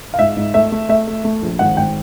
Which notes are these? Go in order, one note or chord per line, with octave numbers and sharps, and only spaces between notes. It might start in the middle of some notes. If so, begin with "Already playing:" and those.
F5
G#2 E5
G#2
A3 E5
A3
A3 E5
A3
A3
A#1
G#1 F#5
G#1 G5